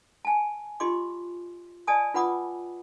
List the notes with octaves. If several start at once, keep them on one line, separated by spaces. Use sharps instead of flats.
G#5 A5
F4 G4 D#5 C6 D6
D5 D#5 G#5 A5 D#6
F4 B4 F#5 B5 D6 D#6